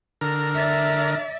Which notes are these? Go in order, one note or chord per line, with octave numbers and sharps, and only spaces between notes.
D3 A#4
D5 E5